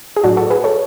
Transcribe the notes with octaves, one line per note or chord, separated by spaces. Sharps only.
G#4
A2 F#3 D4 F#4
F#4 A4
G#4 B4
A4 C#5